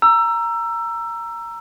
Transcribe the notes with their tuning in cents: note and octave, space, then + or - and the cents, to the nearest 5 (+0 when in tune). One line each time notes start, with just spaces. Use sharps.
A#5 +0 E6 +20